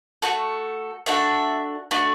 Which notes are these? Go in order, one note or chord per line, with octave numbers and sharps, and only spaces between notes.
A3 F#4 A4
A3 D4 F#4 E5
A3 D4 F#4